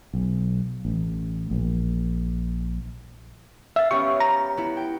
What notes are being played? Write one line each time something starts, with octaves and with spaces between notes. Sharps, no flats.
B1
A1
A#1
E5 F5 A6
B3 C#4 G4 C#6
A#5
B3 E4
G5